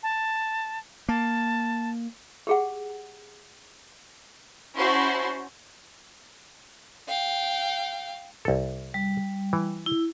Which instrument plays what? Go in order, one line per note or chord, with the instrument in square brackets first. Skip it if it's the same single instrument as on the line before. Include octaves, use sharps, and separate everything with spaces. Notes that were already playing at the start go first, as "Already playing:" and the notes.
[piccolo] A5
[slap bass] A#3 [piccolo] A5
[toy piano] G4 G#4 F#5
[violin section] C#4 E4 F#4 C5 A5 C6
[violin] F5 G5
[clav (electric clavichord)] C2 A4
[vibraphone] G3
[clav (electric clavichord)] E3
[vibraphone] E4